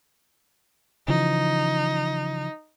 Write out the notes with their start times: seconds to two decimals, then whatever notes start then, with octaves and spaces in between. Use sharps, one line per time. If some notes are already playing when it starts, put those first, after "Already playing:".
1.08 C#3 E3 F3 D#4